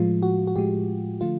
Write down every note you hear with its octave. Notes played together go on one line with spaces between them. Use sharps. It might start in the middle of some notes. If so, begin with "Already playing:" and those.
Already playing: A2 F3 G#3 F4
F#4
F#4
A2 F3 G#3 G4
D3 F3 A3 F4